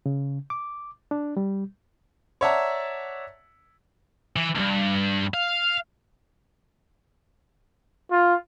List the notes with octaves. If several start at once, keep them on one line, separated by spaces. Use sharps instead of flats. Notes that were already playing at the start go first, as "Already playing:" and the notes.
C#3
D6
D4
G3
C#5 D5 E5 F#5 A5 A#5
E3
C#2 G2
F5
F4